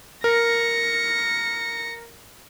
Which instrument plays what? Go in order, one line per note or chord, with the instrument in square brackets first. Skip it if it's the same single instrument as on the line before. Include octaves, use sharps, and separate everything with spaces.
[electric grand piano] A#4 [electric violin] A#6 C#7